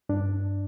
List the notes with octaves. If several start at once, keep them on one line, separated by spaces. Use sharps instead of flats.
G2 D4